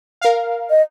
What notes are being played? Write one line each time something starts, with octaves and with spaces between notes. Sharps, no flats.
A#4 F5
D#5